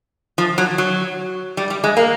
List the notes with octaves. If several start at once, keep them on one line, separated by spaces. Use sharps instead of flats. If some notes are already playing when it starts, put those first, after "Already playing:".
F3
F#3
F#3
G3
G3
G#3
A#3